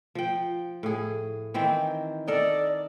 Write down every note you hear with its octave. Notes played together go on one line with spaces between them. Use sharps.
F3 G5
A2 G#4
D#3 E3 C4
A4 A#4 D5 D#5